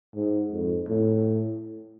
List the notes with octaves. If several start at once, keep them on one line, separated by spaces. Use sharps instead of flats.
G#2
F2
A2